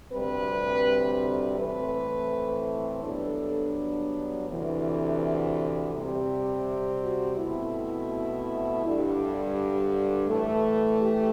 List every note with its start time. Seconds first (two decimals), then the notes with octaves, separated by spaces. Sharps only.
0.13 D2 C3 G3 C4 B4
1.58 A2 E3 A3 C4 B4
3.03 G2 F#3 B3 D4 A4
4.47 D2 C3 E3
5.92 C3 G3 C4
7.02 F#4
7.37 B2 A3 C4 E4
8.83 G2 D3 G3
10.28 A2 E3 A3
11.00 G4